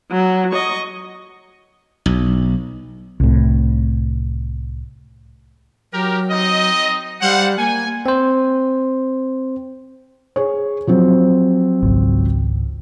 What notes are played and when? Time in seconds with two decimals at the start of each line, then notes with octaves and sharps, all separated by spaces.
0.11 F#3
0.52 D#5 C#6
2.06 B1
3.20 C2 A2
5.93 F#3 G4 A#4
6.31 C4 D#4 D#5
7.21 G3 C5 F5 F#5
7.59 A#3 G#5
8.06 C4 C5
10.36 G#4 C#5
10.87 F3 F#3 C4
11.82 G#1 C#2